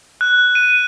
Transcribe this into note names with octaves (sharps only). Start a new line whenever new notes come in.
F#6
D#7